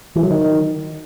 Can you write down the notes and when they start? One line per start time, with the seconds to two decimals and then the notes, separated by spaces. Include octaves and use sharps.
0.16 E3
0.23 F#3
0.31 D#3